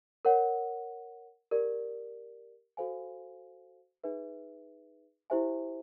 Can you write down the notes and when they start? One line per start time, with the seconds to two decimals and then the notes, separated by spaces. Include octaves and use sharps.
0.25 A#4 C#5 F#5
1.51 G4 A#4 D5
2.77 F#4 A4 C5 F5 G#5
4.04 D#4 G#4 B4 E5
5.30 E4 G4 C5 E5 G#5